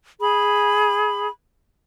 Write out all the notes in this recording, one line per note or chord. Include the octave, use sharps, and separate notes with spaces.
G#4 B5